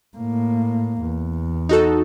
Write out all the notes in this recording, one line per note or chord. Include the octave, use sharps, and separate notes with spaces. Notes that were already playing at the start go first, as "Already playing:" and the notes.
A2 A#3
E2
D#4 F#4 A4